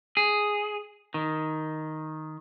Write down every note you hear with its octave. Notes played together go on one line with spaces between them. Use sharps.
G#4
D#3